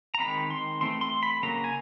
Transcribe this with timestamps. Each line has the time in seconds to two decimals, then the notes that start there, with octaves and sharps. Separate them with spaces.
0.15 A#5
0.20 D#3 G#3 C4 B5
0.50 C6
0.81 E3 A3 C4 C6
1.01 C6
1.23 B5
1.43 C#3 F#3 A#3 A#5
1.64 G#5